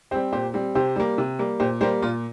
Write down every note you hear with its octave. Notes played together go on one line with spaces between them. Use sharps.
G3 C4 G4 C5
A#2 G4 C5
G3 C4
C3 G4 C5
G3 A#3
C3
G3 A#3
A#2 G4 C5
G3 A#3 G4 C5
A#2 F4